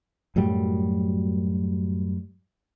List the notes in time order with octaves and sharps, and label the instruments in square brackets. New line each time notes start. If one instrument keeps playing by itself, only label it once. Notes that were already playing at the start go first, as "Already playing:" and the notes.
[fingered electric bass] F#2 A2 F#3 G3